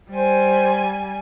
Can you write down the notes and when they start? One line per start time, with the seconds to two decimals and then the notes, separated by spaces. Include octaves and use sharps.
0.11 G3 C5 G#5